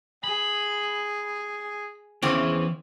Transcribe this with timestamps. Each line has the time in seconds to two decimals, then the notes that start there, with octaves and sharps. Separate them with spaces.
0.24 G#4 B5
2.22 E2 C#3 E3 C4